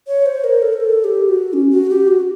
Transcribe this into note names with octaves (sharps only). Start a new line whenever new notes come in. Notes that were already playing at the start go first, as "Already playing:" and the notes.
C#5
C5
A#4
A4
A#4
A4
G4
F#4
C#4
F#4
G4
F#4